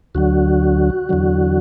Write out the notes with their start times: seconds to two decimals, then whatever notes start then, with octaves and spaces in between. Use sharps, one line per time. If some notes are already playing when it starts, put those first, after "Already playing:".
0.15 D2 D3 F#3 F#4
1.09 E2 D3 F#3